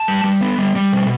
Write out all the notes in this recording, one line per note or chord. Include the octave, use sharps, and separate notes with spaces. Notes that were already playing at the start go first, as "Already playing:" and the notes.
Already playing: A5
G3
G3
B3
G3
G3
B2